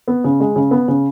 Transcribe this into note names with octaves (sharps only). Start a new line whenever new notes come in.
B3
C#3
G#3
C#3
B3
C#3